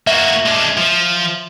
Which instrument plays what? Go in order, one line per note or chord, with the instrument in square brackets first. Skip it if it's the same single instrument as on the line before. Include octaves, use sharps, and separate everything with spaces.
[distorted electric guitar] A#3 F#4 [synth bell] E5
[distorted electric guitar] G#3 D4
F3